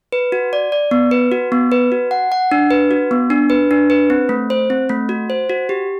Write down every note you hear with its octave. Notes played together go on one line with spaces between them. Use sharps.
B4
F#4
D5
D5
B3
B4
F#4
B3
B4
F#4
F#5
F#5
D4
B4
F#4
B3
D4
B4
D4
B4
C4
A3
C5
C4
A3
F#4
C5
F#4
G4